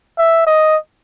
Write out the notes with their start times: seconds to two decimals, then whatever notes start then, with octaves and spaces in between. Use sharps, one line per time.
0.18 E5
0.47 D#5